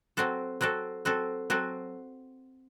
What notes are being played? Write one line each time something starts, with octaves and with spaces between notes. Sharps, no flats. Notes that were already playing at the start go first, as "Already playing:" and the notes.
F#3 C4 F#4 A4
F#3 C4 F#4 A4
F#3 C4 F#4 A4
F#3 C4 F#4 A4